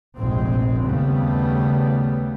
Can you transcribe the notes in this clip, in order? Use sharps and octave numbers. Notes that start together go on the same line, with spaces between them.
F1 A#1 G#2 G#3 C4
D#2 C#3 G3 A3 B3